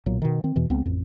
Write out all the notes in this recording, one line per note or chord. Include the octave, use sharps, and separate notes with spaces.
B1 A#2 F#3
B2 D#3
D#3 C4
E2 B2 E3
C#2 B3 C4
A1 F2